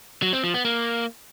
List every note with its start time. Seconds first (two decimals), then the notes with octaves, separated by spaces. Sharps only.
0.22 F#3
0.33 C4
0.44 F3
0.54 B3
0.65 A#3